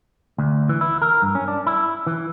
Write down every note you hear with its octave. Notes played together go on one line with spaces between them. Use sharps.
D2
E3
E4
A#4
G2
C#4
D4
E4
E3